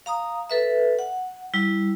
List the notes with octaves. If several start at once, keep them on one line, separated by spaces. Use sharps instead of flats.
F5 A#5 D#6
A4 B4 E5
F#5
G3 E4